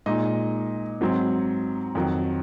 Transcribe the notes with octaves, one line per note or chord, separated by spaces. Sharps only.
A#2 G#3 D#4 D#5
G#2 F#3 C4
F2 D#3 F#3